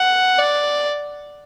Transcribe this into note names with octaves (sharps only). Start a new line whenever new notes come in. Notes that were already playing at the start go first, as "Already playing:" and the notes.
Already playing: F#5
D5